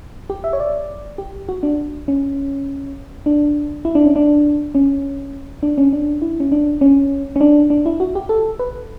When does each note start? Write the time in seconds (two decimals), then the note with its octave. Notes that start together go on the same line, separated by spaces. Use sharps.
0.30 G4
0.44 E5
0.53 C#5
0.60 D5
1.18 G4
1.49 F#4
1.63 D4
2.08 C#4
3.26 D4
3.85 E4
3.95 D4
4.05 C#4
4.16 D4
4.75 C#4
5.63 D4
5.78 C#4
5.93 D4
6.22 E4
6.40 C#4
6.52 D4
6.81 C#4
7.36 C#4
7.41 D4
7.70 D4
7.86 E4
8.00 F#4
8.15 G4
8.29 A4
8.59 B4